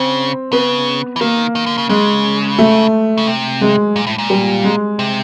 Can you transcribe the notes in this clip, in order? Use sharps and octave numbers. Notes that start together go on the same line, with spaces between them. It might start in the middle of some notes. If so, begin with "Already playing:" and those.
Already playing: C#3 C4
C#3 B3
E3
D#3 A#3
D#3
D3
C#3
C#3 G#3
A3
C#3
C3
G#3
A#2
A2
A#2
G3
G#3
C3